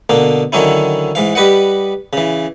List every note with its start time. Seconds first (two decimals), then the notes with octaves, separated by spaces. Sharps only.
0.10 B2 D3 A#3
0.52 D3 D#3 F#3 C#4 D#4 E4
1.15 G#2 E3 F5
1.35 G3 G4 B4 D#5 F#5
2.13 C#3 E3